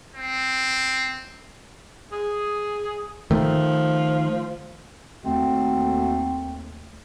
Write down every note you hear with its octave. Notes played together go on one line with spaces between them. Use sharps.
C4
G#4
D#3 F3 A3
D#2 A3 C4 F#4